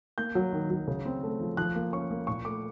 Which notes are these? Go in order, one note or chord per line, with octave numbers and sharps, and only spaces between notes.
A#3 G6
F#3
D#3
F#3
C#3
C4
A3
F3
F3 F#6
A#3
C#4 C#6
A#3
A#2 C#6
A3 D6